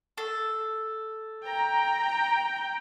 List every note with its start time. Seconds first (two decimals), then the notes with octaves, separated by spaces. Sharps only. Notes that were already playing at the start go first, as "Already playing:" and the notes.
0.18 A4
1.45 G5 A#5